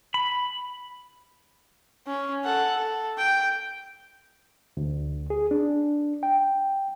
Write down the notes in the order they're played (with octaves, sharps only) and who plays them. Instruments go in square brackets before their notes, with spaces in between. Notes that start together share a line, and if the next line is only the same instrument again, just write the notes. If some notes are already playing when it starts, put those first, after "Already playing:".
[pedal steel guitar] B5
[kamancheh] C#4
A4 F#5
A4
G5
[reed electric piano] D2
G#4
D4
G5